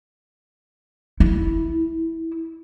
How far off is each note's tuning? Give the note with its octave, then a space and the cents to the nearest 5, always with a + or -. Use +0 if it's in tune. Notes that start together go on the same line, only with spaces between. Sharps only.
E4 -15